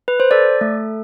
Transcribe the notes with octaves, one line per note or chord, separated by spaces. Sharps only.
B4
C5
A4 D5
A3